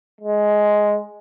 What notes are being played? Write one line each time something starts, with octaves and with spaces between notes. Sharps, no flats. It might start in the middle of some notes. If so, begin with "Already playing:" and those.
G#3